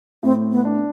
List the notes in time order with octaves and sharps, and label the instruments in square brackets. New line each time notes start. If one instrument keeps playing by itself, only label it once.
[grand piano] A2 [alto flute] C4
[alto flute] B3
[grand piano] D4